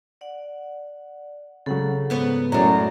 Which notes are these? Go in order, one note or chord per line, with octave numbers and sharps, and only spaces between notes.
D5 F#5
C#3 F#3 A4 F#5
G#2 B3 C#5
F#2 A2 G#3 C#5 D5 A#5